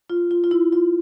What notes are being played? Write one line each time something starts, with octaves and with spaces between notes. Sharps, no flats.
F4
F4
F4
E4
F4